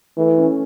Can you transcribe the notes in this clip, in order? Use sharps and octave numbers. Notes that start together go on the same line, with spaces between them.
E3 A3
C#4